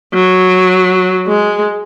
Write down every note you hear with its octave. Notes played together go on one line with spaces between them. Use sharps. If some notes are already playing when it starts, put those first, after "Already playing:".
F#3
G#3